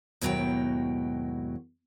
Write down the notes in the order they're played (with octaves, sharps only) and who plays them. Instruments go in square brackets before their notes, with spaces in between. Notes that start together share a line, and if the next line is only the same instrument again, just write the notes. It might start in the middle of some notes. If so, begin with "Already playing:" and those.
[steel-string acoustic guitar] D#2 G#2 B2 F#3 E4 G5